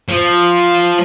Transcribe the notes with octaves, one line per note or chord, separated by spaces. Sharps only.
F3